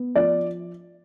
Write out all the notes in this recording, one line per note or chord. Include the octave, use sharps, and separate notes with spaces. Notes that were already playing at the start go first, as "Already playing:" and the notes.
Already playing: B3
F3 D5